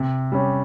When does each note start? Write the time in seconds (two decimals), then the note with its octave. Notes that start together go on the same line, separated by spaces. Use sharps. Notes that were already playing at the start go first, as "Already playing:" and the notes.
Already playing: C3
0.32 G3 C#4